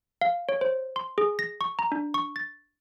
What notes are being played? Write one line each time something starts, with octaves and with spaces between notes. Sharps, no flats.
F5
C#5
C5
C6
G#4
A#6
C#6
A#5
D4
C#6
A6